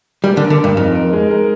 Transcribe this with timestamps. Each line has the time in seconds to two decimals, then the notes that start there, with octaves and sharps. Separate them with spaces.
0.24 G3 A#4
0.37 D3
0.41 A#4
0.50 D3
0.59 G2 A#4
0.77 F2 D#4
0.95 A#4
1.13 G#3
1.31 A#4